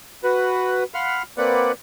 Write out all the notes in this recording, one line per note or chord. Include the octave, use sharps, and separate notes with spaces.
F#4 B4
F5 F#5 B5 C6 F6
A#3 C4 B4 D5 F#5